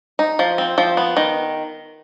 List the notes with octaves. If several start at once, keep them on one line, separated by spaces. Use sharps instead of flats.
D#4
F3
C4
F3
B3
D#3